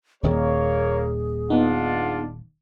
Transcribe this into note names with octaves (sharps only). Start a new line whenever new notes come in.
D#1 D#2 A#3 G#4 C#5
B3 D4 D#4 F4 F#5